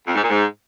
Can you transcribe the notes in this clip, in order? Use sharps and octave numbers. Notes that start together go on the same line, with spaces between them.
F2
G#2
A#2
G#2